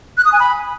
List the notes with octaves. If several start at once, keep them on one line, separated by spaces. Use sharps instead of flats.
F#6
D#6
G#5
B5